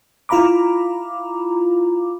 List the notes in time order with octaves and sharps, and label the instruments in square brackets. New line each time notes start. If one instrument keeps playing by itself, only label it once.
[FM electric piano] E4 F4 F5 A#5 B5 D6